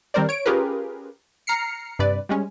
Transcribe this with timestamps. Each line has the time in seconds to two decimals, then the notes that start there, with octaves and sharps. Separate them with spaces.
0.14 D#3 G3 C4 A#4 C5 D5
0.29 C#5 D7
0.46 C#4 F4 G4 G#4 A#4 B4
1.47 A#5 F6 C7 C#7
1.99 G2 C3 B4 D5
2.29 G3 G#3 C#4